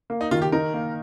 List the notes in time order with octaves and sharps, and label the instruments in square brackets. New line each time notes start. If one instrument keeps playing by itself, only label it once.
[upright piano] A#3
[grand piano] D#4
[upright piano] D#3 [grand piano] F4
[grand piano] G4
[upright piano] D#4 [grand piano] A#4
[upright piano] A#3